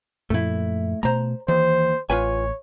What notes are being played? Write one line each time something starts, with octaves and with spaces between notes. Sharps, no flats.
F#2 A#2 F3 A3 E4
B2 A3 C5 A#5
D#2 E3 C5
A1 F4 B4 C#5 G#5